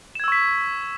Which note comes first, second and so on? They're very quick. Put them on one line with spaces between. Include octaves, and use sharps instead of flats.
E7 G#6 E6 C#6 B6